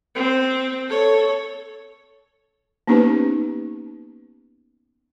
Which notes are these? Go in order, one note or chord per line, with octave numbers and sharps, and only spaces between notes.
C4
A4 C#5
A#3 B3 C#4 D#4 G4 B4